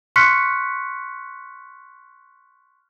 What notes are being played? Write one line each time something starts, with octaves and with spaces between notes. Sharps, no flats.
C6 C#6 F6 F#6 B6 C#7